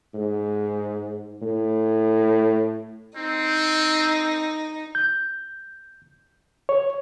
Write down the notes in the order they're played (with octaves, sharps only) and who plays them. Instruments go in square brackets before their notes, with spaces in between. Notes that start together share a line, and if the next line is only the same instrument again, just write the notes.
[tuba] G#2
A2
[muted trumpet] C4 [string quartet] D#4
[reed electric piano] G6
C#5